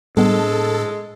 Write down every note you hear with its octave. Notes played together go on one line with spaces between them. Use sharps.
A2 G3 G#3 B3 D4 A4